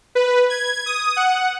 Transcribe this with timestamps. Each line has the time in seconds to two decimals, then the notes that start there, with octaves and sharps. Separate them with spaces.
0.15 B4
0.50 G#6
0.86 D#6
1.16 F#5